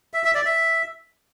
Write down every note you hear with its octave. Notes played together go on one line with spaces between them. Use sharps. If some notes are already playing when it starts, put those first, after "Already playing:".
E5
E5
D5
E5